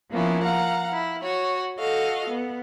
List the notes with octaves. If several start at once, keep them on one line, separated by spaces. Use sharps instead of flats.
F3 A#3 B3 C#4 E4
F5 F#5 A#5
E4
F#4 C#5
F#4 A4 D#5 F5
B3